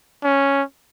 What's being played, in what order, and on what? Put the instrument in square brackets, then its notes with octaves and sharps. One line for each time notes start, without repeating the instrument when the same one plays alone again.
[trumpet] C#4